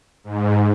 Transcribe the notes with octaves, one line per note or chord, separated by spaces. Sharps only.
G#2